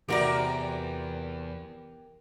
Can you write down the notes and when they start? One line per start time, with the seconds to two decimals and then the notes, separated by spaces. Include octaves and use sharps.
0.08 E2 C3 F#4 G4 A#4 D5